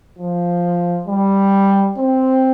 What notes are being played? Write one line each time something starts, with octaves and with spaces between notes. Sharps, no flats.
F3
G3
C4